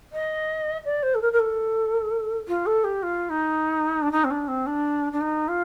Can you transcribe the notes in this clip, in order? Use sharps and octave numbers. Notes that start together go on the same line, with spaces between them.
D#5
D5
C5
A4
A#4
A#4
A4
F4
A4
G4
F4
D#4
D4
D#4
C4
D4
C4
D4
D4
D#4
F4